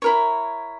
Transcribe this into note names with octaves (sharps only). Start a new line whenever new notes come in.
E4 A#4 C#5